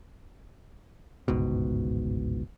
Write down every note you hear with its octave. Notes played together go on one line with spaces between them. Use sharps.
G1 C#2 G#2 B2